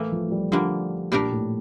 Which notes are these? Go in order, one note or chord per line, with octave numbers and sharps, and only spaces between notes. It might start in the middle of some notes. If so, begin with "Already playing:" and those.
Already playing: A2 E3 A3 A#3
F3
F3
G3
D3 F3 G3 A#3
A#2 G3 D4 G4 A#4
A2